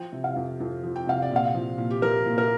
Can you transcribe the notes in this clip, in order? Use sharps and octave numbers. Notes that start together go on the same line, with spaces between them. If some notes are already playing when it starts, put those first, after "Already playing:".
Already playing: F3 G5
C3
F5
F2
F2
F3
G5
C3 F5
D5
A#2 F5
F3
A#2
G4
F3 A#4
A#2
A#4